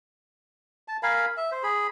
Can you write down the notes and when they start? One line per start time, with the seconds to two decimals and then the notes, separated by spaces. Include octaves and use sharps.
0.88 A5
1.03 A#4 F5 G#5 B5
1.37 E5
1.52 C5
1.63 G#4 B5